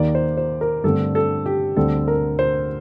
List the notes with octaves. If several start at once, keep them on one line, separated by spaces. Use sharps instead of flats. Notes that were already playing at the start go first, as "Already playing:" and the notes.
Already playing: D#2 D#3 A#3 D5
C5
C5
A#4
G2 D3 A3 C4 A4
A4
G4
D2 D3 G3 C4 A4
A#4
C5